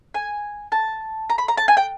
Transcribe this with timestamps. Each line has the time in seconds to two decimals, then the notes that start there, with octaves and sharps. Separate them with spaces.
0.14 G#5
0.72 A5
1.30 A#5
1.38 B5
1.48 A#5
1.58 A5
1.68 G#5
1.77 G5